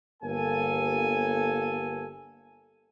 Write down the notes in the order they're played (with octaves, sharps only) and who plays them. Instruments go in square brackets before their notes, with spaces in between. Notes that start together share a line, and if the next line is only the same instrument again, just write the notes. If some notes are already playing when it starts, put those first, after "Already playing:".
[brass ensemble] G1 A#3 A4 G#5